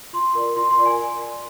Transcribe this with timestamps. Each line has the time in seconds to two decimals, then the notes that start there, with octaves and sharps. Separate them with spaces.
0.13 F4 C6
0.35 A#4 D5
0.56 F4 C6
0.71 C6
0.79 A#4 D5
0.86 G#5